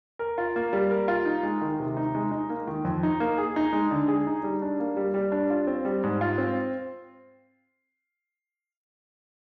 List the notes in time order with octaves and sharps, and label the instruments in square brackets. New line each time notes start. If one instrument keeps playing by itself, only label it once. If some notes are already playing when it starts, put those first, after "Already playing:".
[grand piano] A#4
F4
A#3
G3
A#4
F4
D#4
G#3
D#3
C3
D#4
G#3
D#4
A#3
D#3
F2
D#4
A#3
G#4
D#4
G#3
D3
G#4
D#4
G3
D4
A#3
G3
G3
D4
F4
C4
G3
G#2
F4
C4